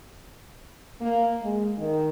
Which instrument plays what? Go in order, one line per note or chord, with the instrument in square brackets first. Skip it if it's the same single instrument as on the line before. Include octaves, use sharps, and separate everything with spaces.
[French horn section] A#3
G#3
D#3